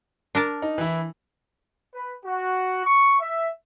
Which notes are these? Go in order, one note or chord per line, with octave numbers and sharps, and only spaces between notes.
D4 A#4 A5
D#4
E3 E4
B4
F#4
C#6
E5